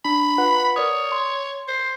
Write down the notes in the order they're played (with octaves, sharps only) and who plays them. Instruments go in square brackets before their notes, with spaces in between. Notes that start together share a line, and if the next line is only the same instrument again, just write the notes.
[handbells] D4 [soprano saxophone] B5
[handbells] F4 B4 F#5
[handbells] A#4 D5 D#6 [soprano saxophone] C#5
[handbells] C6
[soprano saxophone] C5